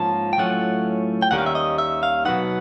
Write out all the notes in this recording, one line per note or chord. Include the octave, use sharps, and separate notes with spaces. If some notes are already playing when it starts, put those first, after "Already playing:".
Already playing: G#2 F3 A#3 C#4 F4 A5
G5
A2 F#3 A3 C#4 F4 F#5
G5
D#2 D#3 G3 A#3 C#4 F#5
F5
E5
D#5
E5
F5
B2 F#3 B3 D#4 F#5